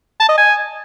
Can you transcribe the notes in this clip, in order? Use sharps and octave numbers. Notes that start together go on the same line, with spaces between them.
A5
D#5
G#5